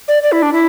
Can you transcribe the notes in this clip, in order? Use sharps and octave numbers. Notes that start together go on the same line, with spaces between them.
D5
D5
E4
D4
E4